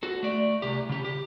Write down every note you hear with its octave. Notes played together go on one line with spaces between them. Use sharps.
F#4 A4
A3 D5
C2 G4
C#3 G4
G4